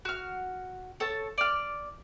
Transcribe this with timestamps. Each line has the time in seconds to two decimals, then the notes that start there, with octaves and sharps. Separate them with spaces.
0.05 F#4 F6
1.00 A4 C#5 A5
1.38 D5 F6